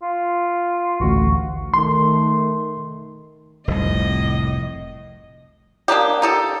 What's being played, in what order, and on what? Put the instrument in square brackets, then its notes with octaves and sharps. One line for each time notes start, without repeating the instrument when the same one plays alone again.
[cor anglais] F4
[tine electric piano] A1 D2 [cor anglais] F#4
[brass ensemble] D#3 A3 [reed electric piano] C6
[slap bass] F1 C2 [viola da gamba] A2 D#5
[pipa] A#3 D4 D#4 G4
D#4 G4 A4